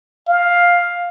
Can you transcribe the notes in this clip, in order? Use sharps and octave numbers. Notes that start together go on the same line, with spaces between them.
F5